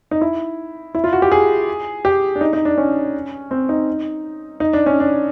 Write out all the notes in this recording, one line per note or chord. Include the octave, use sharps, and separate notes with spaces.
D#4
E4
E4
F4
F#4
G4
G#4
G4
D4
D#4
D#4
D4
C#4
C4
D#4
D#4
D4
C#4
D4